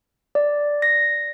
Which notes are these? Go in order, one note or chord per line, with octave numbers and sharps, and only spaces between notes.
D5
A#6